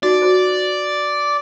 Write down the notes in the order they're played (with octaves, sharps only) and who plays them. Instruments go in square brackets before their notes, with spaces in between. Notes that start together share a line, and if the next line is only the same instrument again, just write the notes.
[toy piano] D#4 F#4 [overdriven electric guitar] D5
[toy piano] F#4 C5